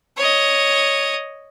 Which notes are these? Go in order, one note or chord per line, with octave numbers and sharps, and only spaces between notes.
C#5 D#5